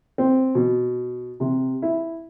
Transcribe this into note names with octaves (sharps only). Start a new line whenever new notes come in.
C4
B2
C3
E4